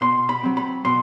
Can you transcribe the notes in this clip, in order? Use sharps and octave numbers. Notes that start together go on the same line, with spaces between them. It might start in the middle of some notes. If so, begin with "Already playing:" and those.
B2 C6
B5
F#3 C4
B5
B2 C6